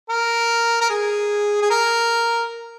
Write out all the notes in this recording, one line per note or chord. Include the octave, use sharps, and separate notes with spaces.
A#4
A#4
G#4
G#4
A#4